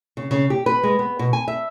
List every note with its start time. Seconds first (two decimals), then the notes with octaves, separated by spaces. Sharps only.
0.17 C#3
0.31 C#3
0.50 G4
0.66 B4
0.83 G#3
0.99 B3
1.19 B2
1.33 G#5
1.48 E5